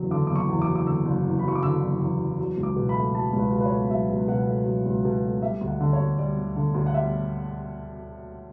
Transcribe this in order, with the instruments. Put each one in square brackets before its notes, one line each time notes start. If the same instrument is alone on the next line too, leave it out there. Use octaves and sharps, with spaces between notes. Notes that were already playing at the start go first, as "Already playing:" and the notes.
Already playing: [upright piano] F#1 E2 F#3
D3 D6
F#1 D6
C#6
E2
D6
F#3
D6
D3 E6
F#1
E2
B5
F#3 C#6
D6
D3 E6
F#1
E2
F#3
F#3
C#2
D6
B2
B5
A3
F#3 A5
C#2
B4
B2
B4
C#5
A3
F#3 E5
C#2
B2 F#5
A3
F#3
C#2
B2
A3
G3 E5
D2
F#5
D3
C#5
D2
G3 D5
D2
D3
D2
F#5
G3 E5